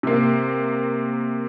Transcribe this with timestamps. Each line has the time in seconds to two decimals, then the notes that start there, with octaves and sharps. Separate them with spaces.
0.03 C3 A#3